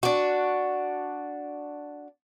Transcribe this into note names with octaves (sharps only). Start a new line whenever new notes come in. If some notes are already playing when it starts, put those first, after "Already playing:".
D4 F#4